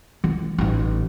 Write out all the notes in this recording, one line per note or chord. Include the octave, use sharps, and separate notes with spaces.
E3
A1 D#4